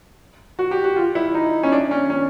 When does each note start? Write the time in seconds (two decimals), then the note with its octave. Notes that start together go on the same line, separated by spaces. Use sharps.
0.59 F#4
0.71 G4
0.84 F#4
0.96 F4
1.15 E4
1.34 D#4
1.63 C#4
1.72 D4
1.91 C#4
2.10 C#4